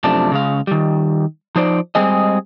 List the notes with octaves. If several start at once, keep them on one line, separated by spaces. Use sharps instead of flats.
F#2 C3 F3 A3 D4
C#3 G#3 F5
D#3 G3
F3 D#4 C5 D5
G3 G#3 C4 G#4 D#5